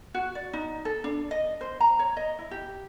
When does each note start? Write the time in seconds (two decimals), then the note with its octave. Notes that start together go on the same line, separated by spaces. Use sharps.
0.14 F#4
0.35 D5
0.53 D#4
0.85 A4
1.04 D4
1.31 D#5
1.61 C5
1.80 A#5
1.99 C#5
2.17 D#5
2.39 E4
2.51 G4